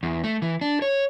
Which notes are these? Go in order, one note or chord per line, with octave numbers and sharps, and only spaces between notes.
E2
A3
E3
D4
C#5